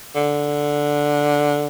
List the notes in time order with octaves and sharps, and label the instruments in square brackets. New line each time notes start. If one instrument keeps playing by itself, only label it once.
[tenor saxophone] D3